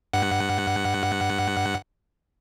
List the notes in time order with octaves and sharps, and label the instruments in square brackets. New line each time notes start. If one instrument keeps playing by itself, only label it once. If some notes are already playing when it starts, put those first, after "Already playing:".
[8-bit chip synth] G2 F#5